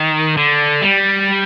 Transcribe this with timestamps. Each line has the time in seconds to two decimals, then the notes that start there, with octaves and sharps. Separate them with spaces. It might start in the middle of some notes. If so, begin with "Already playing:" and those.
Already playing: D#3
0.37 D3
0.82 G3